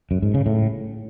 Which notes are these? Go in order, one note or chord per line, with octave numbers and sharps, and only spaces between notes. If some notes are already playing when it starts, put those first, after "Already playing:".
F#2
G#2
C#3
A2